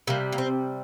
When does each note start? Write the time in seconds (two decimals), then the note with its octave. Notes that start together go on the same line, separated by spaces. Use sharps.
0.07 C3 G3 A#3
0.32 A#3
0.38 C4